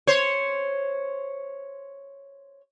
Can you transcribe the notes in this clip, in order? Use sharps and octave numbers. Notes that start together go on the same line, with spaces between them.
C5 C#5